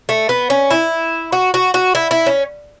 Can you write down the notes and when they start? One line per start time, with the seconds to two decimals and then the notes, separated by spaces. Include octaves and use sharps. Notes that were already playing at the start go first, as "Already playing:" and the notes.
0.09 A3
0.29 B3
0.50 C#4
0.71 E4
1.32 F#4
1.54 F#4
1.74 F#4
1.95 E4
2.11 E4
2.26 C#4